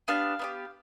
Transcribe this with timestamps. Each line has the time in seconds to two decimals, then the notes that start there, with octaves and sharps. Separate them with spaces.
0.08 B3 D4 G4 F5
0.39 B3 D4 G4